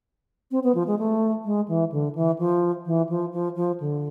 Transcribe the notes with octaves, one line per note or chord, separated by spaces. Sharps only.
C4
B3
F3
G#3
A3
G#3
E3
D3
E3
F3
E3
F3
F3
F3
D3